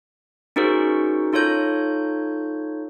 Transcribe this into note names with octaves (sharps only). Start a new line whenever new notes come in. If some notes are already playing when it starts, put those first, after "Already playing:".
C#4 D#4 F#4 G#4 A#4 C5
D#4 F4 A4 C#5 G6